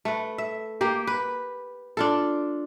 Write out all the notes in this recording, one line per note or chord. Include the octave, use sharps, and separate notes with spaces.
A3 B4
E5
A#3 G4
B4
D4 F4 A4